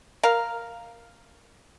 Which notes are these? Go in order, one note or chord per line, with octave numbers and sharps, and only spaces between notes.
A#4 F5